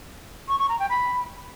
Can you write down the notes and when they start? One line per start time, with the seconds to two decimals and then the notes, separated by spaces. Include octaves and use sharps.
0.48 C#6
0.59 C#6
0.69 A#5
0.79 G5
0.89 B5